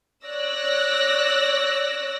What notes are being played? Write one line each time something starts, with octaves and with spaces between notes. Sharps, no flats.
C#5 D5 E6 F#6 A#6